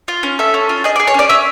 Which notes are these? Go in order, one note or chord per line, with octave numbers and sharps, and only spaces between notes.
F4
C#4
A4 E5
C#4
F4
G#4 D#5
D5
G#4
C#5
C#4 D5
C#4 E5